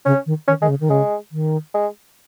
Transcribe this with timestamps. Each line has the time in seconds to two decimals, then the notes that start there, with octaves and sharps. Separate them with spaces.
0.06 C#3 C#4
0.26 D#3
0.48 D#3 C#4
0.60 D#3 G#3
0.68 C#3
0.81 D#3
0.90 C#3 G#3
1.32 D#3
1.74 G#3